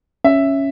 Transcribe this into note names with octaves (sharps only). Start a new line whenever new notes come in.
C#4 E5